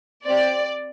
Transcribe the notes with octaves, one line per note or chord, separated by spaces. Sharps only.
C4 G4 D5